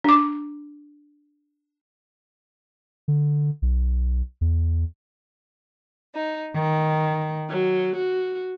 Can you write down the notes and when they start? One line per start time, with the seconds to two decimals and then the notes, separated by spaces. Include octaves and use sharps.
0.04 D4 D6
3.08 D3
3.62 B1
4.41 E2
6.13 D#4
6.53 D#3
7.48 F#3
7.96 F#4